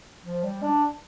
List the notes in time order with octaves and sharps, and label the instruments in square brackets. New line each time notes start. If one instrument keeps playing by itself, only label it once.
[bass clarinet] F3
G3
D4